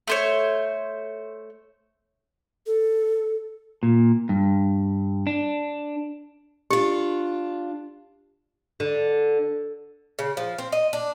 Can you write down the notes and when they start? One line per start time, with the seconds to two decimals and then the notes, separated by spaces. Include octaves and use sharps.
0.07 A3 C5 C#5
2.66 A4
3.83 A#2
4.29 G2
5.27 D4
6.70 D4 F4 G4
8.80 D3
10.19 C#3
10.37 F3
10.58 C4
10.72 D#5
10.93 D4